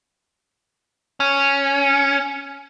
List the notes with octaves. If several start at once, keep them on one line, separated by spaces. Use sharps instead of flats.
C#4